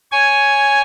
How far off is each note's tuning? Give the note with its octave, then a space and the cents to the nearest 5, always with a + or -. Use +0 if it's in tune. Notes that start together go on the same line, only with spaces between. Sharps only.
C#5 +5 G#5 +0